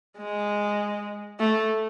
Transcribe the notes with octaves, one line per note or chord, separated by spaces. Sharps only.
G#3
A3